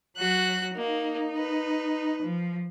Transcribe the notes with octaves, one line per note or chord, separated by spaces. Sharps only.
F#3 F#4 F#6
A#3 D#4
B4
F3